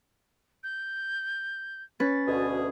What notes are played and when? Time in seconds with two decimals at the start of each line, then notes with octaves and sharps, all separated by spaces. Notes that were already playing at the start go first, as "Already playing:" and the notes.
0.63 G6
2.00 C#4 B4 A6
2.27 D2 B2 G#4